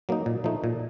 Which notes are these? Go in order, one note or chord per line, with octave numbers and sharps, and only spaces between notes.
F#3 A#3 D#4
A#2
F3 A3 D#4
A#2